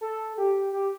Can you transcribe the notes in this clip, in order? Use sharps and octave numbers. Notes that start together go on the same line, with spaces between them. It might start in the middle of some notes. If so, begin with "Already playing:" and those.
A4
G4
G4